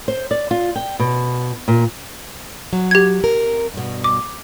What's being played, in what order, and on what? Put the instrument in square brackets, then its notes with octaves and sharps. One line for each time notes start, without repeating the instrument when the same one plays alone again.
[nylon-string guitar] C5
D5
F4
G5
B2
A#2
[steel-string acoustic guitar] F#3
[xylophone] G4 G#6
[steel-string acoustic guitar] C3 A#4
G2 B2
[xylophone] D6